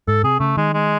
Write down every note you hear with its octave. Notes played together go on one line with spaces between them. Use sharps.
G#2 A4
C3 G#4
C#3 A3
D#3 G#3
G#3